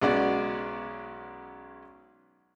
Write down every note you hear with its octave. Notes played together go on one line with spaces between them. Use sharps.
B1 G#3 B3 C#4 F#4 D5